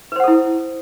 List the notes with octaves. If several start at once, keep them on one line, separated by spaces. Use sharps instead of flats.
E4 A4 B4 C5 F#5